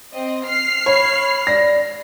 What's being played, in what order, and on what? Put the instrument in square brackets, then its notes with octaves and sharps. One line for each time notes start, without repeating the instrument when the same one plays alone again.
[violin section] C4 D#5
F6 C7
[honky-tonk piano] C#5 [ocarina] B5
[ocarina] D5 [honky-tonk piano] A#6